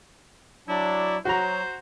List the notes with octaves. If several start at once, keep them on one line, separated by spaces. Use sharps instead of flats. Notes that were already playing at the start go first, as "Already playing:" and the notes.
F#3 D4 E4
F#3 F#4 C5 A#5